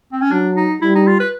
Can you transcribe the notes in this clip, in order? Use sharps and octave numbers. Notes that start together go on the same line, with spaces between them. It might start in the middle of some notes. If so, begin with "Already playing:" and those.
C4
C#4
F#3 D4
D#4
G3 E4
D#4
F4
B4